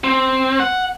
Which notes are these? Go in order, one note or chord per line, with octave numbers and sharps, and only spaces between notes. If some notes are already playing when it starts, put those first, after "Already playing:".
C4
F#5